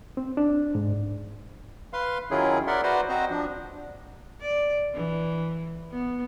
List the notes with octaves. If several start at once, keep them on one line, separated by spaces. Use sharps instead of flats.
C4
D4
G#2
B4 F5 C6
D#3 F#3 C#4 E4 F4 G#4
A#4 D5 E5 F#5 C6
F#4 B4 C5 D5 A#5 C6
C4 F#4 C5 D#5 A#5
F3 D4
D5
E3
B3